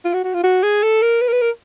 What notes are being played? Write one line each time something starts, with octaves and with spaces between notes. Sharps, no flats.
F4
F#4
F#4
F4
F#4
G#4
A4
A#4
B4
A#4
B4
A#4